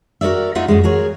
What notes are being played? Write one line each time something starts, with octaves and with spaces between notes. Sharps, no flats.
F#4 A#4 C5 D5 E5
A3 D#4 F4 E5 F#5
F#2 A2 C#3 G#3
F#4 G#4 A#4 C#5